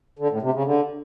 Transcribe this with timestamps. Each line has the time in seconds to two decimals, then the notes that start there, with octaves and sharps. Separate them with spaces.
0.19 D3
0.30 A2
0.42 C3
0.53 C#3
0.65 D3